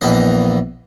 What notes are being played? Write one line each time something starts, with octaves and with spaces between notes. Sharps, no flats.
A#1 E2 E3 A#3 D#5